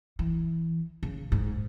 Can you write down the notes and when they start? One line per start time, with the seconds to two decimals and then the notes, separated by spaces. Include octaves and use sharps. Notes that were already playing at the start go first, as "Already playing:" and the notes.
0.19 E3
1.03 C#3
1.32 G#2